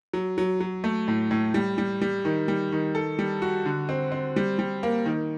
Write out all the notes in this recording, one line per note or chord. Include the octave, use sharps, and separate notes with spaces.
F#3
F#3
F#3
A3
A2
A2
G3
G3
G3
D#3
G3
D#3
A4
G3
F#4
D3
C4
C4
G3
G3
A#3
D#3